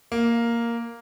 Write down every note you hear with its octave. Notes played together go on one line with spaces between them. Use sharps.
A#3